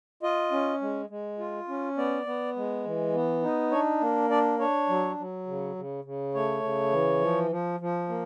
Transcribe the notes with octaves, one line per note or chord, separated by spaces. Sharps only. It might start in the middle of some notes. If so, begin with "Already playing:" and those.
F4 D#5
C#4
G#3
G#3
F4
C#4
B3 D5
B3
G#3
E3
B3
D#4
D4 C#5
A#3
D4 D5
D4 C#5
F#3
F#3
C#3
C#3
C#3
A3 C#5
C#3
E3
F3
F3
F3
A#3